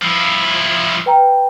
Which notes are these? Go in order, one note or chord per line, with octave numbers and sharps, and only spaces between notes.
F3 E4
B4 G5 A#5